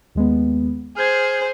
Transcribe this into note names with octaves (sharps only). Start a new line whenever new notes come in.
D#2 G#3 B3
G#4 C5 F6 G6 G#6